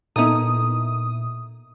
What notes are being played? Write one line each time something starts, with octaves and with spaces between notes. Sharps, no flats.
A#2 B3 D#4 E4 A4 A#4 D#6